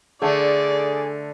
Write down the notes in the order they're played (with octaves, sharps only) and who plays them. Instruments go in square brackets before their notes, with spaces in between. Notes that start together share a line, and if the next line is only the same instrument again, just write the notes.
[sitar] D3 A3 [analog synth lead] G#4 [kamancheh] D5